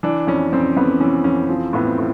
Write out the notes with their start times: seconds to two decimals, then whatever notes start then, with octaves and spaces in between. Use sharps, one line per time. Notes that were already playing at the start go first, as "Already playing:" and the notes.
0.03 E3 D4
0.27 F2 C#4
0.53 F2 C4
0.76 F2 B3
1.00 E3 C#4
1.24 F2 C#4
1.48 F3 C4
1.73 A2 B3
1.86 C4
1.98 A2